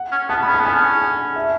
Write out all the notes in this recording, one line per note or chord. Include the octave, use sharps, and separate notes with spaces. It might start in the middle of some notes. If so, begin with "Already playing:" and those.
Already playing: F#5
C#4
B3 A5
C#4 B5
A5
B3
G#5
C#4
G#5
E5